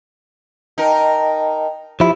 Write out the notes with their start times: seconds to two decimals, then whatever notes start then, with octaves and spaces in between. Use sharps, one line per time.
0.78 D#4 A#4 D#5 G5 A5
2.00 F3 E4 G4